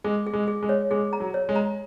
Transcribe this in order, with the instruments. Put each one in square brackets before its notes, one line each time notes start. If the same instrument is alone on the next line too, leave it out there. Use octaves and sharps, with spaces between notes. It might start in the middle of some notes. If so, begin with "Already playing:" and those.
[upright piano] G#3 [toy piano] G#4
[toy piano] G#4
[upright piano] G#3
[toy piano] G#4
[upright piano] G#3
[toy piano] C#5
[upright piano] G#3 [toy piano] G#4
[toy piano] A#5
[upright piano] F#3
[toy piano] C#5
[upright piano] G#3
[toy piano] A#5